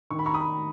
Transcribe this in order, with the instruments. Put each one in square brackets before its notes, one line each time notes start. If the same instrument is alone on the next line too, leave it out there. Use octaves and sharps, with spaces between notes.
[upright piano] D#3 C#6
B5
A#5 C#6
B5 D#6